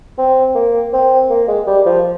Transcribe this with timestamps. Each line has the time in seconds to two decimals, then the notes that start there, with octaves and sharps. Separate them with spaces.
0.18 C4
0.55 A#3
0.93 C4
1.30 A#3
1.48 G#3
1.67 G3
1.86 F3